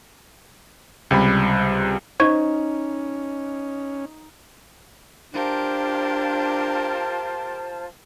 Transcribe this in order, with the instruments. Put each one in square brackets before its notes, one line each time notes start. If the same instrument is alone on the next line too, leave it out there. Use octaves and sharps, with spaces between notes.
[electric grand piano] C#2 C3 G3 B5
[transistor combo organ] C#4 [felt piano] D#4 [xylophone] C5 C#6 G#6
[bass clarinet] D4 [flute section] F4 A5 [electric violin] G4 A#4 [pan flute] C5